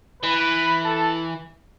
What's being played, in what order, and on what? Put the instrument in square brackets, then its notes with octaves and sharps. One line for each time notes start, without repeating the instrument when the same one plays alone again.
[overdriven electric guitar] E3 [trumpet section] B4 B5
[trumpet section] A4 A5